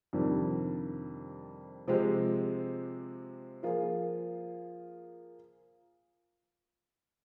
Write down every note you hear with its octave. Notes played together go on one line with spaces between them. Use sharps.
F2 C3 D#3 G3 D4
C3 F3 G#3 C4 G4
F3 A#3 F4 G#4